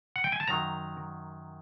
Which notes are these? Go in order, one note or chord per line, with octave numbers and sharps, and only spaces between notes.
F#5
G5
G#5
A5
F#2 D#3 F#3 A#5